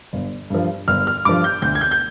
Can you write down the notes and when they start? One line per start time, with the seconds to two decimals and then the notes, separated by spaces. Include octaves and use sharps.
0.13 G1
0.50 G2 F3
0.88 G1 F6
1.07 F6
1.25 G2 F3 D6
1.44 G6
1.62 D2 G6
1.75 G#6
1.81 G6
1.91 G6